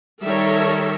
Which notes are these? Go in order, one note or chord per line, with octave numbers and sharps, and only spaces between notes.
D#3 G3 A4 A#4 C#5 E5